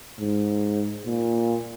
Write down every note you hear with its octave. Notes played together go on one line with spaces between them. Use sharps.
G#2
A#2